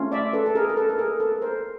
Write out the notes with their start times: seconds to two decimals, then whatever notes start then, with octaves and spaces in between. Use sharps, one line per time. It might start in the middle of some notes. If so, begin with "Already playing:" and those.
Already playing: A3 C#4 F4
0.12 D5 E5
0.33 A4 B4
0.46 A4
0.55 G#4 A#4
0.69 A#4
0.76 A4 B4
0.89 A4
0.98 G#4 A#4
1.20 A4 B4
1.42 A#4 C5